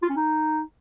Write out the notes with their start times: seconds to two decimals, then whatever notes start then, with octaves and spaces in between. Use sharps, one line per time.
0.02 F4
0.09 C#4
0.16 D#4